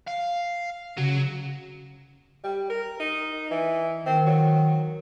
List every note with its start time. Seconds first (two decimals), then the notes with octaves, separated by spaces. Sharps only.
0.08 F5
0.97 C#3 F#3
2.44 G3
2.70 A#4
3.00 D#4
3.51 E3
4.06 D#3 C4
4.26 F#3